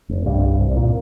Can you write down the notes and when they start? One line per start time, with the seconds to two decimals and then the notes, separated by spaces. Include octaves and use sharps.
0.09 F1
0.26 C2 G2 G3
0.43 C2
0.60 C2
0.76 A#2